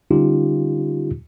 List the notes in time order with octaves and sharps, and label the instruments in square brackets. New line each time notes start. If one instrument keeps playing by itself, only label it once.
[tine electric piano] D3 G3 C#4 D#4 F4 G4